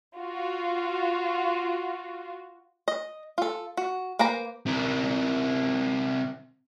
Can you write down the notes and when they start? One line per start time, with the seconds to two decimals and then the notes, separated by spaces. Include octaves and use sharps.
0.18 F4 F#4
2.88 D#5
3.38 F4 A4
3.77 F#4
4.19 A#3 B4 C5 A#5
4.66 C3 A#4